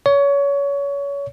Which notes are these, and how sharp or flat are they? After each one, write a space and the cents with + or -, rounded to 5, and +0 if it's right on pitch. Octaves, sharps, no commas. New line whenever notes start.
C#5 +25